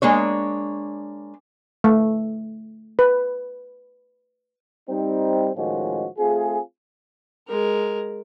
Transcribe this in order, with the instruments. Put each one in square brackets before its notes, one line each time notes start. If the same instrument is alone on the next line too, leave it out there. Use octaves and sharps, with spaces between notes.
[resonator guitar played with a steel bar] G#3 A#3 D4 C#5
[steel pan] A3
B4
[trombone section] G3 C4 D#4
A2 D#3 F3 G#3 C#4 F#4
A3 C4 F4 G#4
[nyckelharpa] G#3 A#4